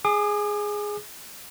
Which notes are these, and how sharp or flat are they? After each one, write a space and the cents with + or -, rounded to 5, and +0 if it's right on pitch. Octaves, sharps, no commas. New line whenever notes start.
G#4 +0 D6 +45